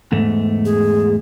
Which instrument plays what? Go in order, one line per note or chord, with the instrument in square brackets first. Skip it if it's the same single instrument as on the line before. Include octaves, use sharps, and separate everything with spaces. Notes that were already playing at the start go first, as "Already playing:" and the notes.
[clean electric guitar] E2 G#2 A3
[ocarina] G#4